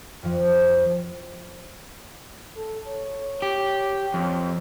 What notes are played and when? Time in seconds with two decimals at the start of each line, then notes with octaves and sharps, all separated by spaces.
0.23 F2 F3
2.56 A4
2.87 C#5
3.42 G4
4.14 F2